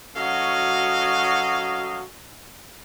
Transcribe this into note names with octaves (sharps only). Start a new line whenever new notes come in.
F#3 C#4 F#4 A4 D#5 F5